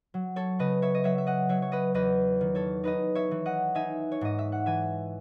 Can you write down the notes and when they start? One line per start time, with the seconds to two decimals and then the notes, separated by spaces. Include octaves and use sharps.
0.14 F#3
0.36 A4 C#5
0.59 C#3 B4 D#5
0.82 C#5 E5
0.94 D#5
1.04 F#3 C#5 E5
1.18 E5
1.27 D#5 F#5
1.49 F#3 C#5 E5
1.62 C#5
1.72 B4 D#5
1.94 E2 B4 D#5
2.41 D#3
2.55 A4 C#5
2.84 D#4 B4 D#5
3.15 C#5 E5
3.31 E3
3.45 D#5 F#5
3.75 D#4 E5 G#5
4.12 C#5
4.21 G#2 D#5
4.39 E5
4.52 F#5
4.66 E3 E5 G#5